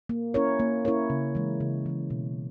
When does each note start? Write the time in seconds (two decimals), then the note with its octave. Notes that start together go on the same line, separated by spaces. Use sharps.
0.09 A#3
0.34 C#4 E4 A#4 C#5
0.59 A#3
0.85 C#4 E4 A#4 C#5
1.10 C#3
1.35 E3 G#3
1.61 C#3
1.86 E3 G#3
2.10 B2